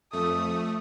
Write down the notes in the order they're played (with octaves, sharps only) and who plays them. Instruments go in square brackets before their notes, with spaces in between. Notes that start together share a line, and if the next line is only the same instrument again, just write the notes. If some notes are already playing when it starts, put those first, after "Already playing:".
[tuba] F2 [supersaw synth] A3 [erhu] D#6